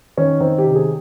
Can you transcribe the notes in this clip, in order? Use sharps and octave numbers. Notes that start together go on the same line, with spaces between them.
D#3 C#4
D#3 C4
G4
C3
G#4